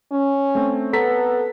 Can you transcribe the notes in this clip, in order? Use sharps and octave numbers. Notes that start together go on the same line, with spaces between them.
C#4
A3 C4
B3 A4 A#5 B6